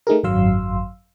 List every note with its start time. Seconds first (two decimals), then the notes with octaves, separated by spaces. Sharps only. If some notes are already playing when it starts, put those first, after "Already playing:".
0.07 A3 D#4 G#4 A#4
0.24 G#1 F#2 F#3 F5 C6 E6